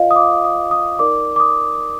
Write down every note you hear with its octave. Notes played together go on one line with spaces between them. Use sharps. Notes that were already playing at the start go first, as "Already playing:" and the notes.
Already playing: F4 C5 D#5 F5
D#6
D6
D#6
D#6
D#4 A#4 D5 D6
D6
D#6